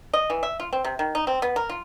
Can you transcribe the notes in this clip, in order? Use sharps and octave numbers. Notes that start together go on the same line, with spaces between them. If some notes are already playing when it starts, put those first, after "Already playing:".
D#5
E3
E5
F4
C4
C3
D#3
D#4
C4
B3
A#4
F4